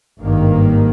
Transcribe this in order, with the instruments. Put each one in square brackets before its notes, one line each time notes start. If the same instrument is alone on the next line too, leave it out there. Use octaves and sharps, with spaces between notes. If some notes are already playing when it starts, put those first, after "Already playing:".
[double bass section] G#1 G2 D#3 A#3